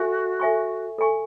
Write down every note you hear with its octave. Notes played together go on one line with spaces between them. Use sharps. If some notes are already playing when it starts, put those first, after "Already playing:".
Already playing: F#4 A4 E5 G#5
A4 E5 G#5 C#6
A4 E5 G#5 C#6